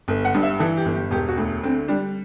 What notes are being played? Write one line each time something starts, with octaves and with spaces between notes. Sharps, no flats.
G1
F#5
G2
E5
E3 A4
G4
G1
G4
E1 G4
F#4
D2
D3 C4
G3 D4